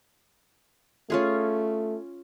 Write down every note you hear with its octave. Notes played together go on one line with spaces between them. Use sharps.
A3 C#4 F4 G#4